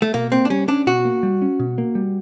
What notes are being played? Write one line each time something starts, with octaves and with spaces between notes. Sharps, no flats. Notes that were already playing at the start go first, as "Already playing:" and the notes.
A3
B2 A#3
A#3 C4
D4
G3 C#4
C#4 D4
B2 F#4
A#3
G3
C#4
B2
A#3
G3